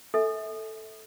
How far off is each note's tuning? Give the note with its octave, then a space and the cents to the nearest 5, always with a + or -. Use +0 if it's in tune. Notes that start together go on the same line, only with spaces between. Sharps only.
A4 +0 E5 -35 G#5 +15